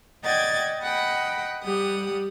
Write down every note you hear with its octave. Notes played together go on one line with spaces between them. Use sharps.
D5 D#5 F#5 G5 G#6 A6
D#5 F#5 G5 B5
G3 G4 F#5 D#6